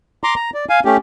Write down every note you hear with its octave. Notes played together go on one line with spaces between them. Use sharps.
A#5 C6 D6
A#5
D5
F5 G#5
A3 C#4 G4